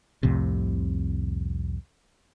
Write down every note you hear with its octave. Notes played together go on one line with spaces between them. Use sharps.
C2 F2 A2 C3